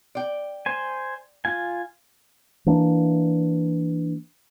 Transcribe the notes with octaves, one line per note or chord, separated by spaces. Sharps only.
D5 G5
C5 G#5
F4 G#5
E3 A#3 D4